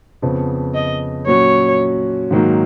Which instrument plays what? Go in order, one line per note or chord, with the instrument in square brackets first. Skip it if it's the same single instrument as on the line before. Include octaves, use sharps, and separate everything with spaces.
[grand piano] F2 C#3 F3 B3
[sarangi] D#5
[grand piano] A#2 F#3 C#4 F#4 [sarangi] C#5
[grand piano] G#2 D#3 F#3 A#3